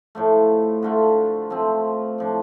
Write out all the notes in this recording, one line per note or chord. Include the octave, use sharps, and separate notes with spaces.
A2 F3 A3
D3 A3 F4
F3 A3 C4
A2 F3 D4